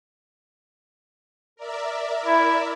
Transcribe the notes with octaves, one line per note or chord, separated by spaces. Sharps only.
A#4 D5 E5
E4